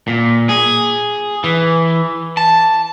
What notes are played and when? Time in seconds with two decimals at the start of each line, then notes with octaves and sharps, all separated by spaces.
0.08 A#2
0.49 G#4
1.44 E3
2.37 A5